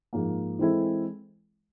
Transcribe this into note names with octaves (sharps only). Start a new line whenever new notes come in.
G#2 F3 A#3
E3 G#3 C4 E4 A4